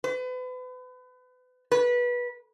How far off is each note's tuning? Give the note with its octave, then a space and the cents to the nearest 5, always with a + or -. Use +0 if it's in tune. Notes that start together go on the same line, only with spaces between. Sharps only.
B4 +35
B4 -20